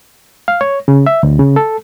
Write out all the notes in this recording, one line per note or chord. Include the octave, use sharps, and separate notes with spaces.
F5
C#5
C#3
E5
D2
C#3
A4